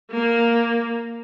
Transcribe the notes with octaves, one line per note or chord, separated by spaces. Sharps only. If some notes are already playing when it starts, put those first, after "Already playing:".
A#3